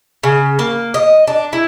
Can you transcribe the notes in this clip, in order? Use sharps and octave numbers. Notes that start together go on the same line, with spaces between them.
C#3
A#3
D#5
D4
E4